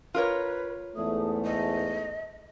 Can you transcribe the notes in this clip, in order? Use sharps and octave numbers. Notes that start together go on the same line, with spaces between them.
F4 A#4 B4 C#5
E2 G#2 A3 D#6
D#5